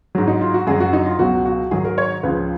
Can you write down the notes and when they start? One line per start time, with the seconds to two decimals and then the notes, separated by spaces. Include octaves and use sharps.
0.15 G#2 F#3
0.28 D#4
0.41 F4
0.54 F#4
0.67 F#2 C#3 F#3 G#4
0.80 F#4
0.93 D#4
1.06 F4
1.19 C#2 B2 F#3 F#4
1.45 F#4
1.71 G#2 D#3 F#3 G#4
1.85 A#4
1.98 C#5
2.23 C#2 C#3 F3 B4